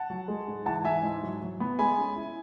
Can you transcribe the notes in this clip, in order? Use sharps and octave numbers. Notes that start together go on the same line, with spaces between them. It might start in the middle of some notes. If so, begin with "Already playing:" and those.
Already playing: F#5 A5
F#3
G#3
G#2
E3 F#5 A5
E3 E5 G#5
G#2
F#3
F#3
B3
G#3 G#5 B5
C#4
E4